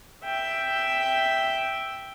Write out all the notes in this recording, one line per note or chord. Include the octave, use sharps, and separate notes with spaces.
E5 G5